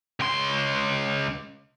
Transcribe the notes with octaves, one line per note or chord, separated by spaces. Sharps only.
C#2 C6